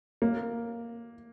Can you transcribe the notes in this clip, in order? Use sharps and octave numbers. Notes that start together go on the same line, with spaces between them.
A#3